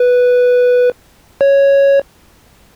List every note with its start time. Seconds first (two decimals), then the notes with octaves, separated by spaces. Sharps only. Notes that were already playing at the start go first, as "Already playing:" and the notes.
Already playing: B4
1.41 C#5